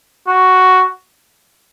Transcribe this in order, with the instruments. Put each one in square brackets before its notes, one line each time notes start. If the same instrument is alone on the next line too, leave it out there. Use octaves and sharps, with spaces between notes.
[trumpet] F#4